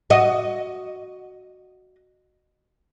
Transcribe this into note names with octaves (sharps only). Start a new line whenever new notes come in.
F#4 D#5